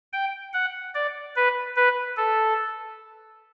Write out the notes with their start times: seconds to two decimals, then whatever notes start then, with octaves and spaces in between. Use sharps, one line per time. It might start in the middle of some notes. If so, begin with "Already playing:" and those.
0.13 G5
0.53 F#5
0.95 D5
1.36 B4
1.76 B4
2.17 A4